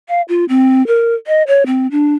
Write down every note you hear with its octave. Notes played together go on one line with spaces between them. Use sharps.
F5
F4
C4
A#4
D#5
C#5
C4
D4